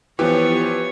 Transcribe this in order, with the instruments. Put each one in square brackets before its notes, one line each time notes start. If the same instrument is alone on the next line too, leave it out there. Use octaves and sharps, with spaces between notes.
[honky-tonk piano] E3 [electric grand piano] F3 B3 G4 [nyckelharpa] C#5